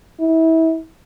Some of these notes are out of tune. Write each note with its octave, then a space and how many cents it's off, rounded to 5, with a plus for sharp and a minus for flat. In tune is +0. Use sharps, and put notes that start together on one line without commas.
E4 -30